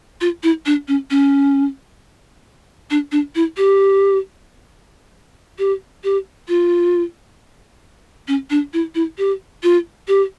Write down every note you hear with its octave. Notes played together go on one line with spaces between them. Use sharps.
F4
E4
D4
C#4
C#4
D4
D4
E4
G4
G4
G4
F4
C#4
D4
E4
E4
G4
F4
G4